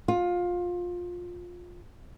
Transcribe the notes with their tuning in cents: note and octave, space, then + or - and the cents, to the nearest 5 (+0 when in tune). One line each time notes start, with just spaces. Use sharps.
F4 +20